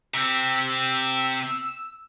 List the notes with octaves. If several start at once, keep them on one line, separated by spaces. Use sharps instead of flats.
C3 C4 E6